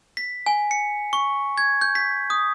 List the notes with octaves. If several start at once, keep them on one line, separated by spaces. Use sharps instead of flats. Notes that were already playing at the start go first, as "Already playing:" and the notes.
B6
G#5
C#7
C#6
G#6
G6
B6
D#6